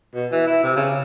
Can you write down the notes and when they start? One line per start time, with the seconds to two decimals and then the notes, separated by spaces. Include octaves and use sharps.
0.15 B2
0.32 E3
0.47 E4
0.64 C3
0.76 C#3